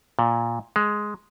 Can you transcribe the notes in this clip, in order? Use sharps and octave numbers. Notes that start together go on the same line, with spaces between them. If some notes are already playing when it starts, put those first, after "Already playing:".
A#2
G#3